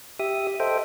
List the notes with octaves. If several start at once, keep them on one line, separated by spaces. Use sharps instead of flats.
G4 E5 D#6
A4 C5 D#5 E5 G5